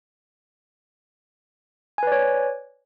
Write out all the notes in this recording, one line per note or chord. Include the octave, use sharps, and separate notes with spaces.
B4 C#5 D5 G#5